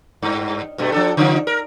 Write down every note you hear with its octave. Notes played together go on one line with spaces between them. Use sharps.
G2
G2 B2 A3
F3 D4 A4
C#3 F3 D#4
A#4